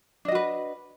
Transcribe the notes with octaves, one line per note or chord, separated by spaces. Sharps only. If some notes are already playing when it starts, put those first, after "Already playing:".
D4 F#4 B4 D#5